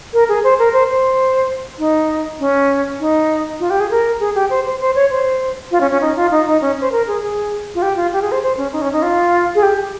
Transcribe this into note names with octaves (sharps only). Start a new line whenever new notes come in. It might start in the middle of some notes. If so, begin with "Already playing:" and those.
A#4
G#4
C5
A#4
C5
C5
D#4
C#4
D#4
F4
G4
G#4
A#4
G#4
G4
C5
C5
C5
C#5
C5
F4
C#4
C#4
D#4
F4
D#4
D#4
C#4
C5
A#4
G#4
G#4
F4
G4
F4
G4
G#4
C5
C5
C#4
D#4
C#4
D#4
F4
G#4
G4